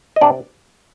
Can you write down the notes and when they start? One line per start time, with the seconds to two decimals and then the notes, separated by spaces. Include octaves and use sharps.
0.16 D#5
0.21 C3 D4 D5